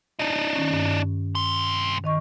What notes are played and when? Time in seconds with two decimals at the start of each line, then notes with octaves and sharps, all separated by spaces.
0.19 D4 D#4
0.55 D#3 C#4
0.72 G2
1.35 C2 C6
2.04 D#3 D#5 C#6